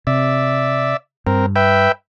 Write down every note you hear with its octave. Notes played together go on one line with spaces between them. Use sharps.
C3 D5 E5
G2 C4 A#4
B4 E5 G5